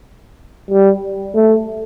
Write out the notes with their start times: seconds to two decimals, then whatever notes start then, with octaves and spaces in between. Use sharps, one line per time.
0.71 G3
1.35 A3